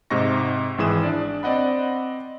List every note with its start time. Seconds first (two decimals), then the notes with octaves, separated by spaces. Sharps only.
0.10 G#2 C3 D#5 C#6 A#6
0.78 G#1 G#2 E3 G#4 D#6 E7
1.03 D4 D5
1.43 C4 D5 D#5 F#5 B5